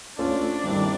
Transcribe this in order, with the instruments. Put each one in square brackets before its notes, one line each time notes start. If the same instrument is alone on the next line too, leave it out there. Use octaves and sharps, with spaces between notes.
[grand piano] A3 C#4 F4 A4 C5 [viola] D4
[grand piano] G2 D#3 G3 C4 E4